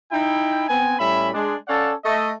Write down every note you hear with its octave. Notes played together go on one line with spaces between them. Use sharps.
D#4 E4 G5
B3 C4 G#5
A2 G3 C#4 E5 B5
G#3 D4
C#4 A4 D5 F5 F#5 A5
A3 D#5